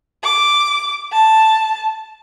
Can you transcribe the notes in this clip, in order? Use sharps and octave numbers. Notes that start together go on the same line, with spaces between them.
D6
A5